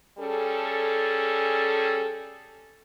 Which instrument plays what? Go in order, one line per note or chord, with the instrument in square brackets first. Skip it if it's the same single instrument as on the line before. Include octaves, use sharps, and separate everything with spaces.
[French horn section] G3 C#4 G#4 A4